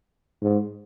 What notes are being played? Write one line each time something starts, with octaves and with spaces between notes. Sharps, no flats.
G#2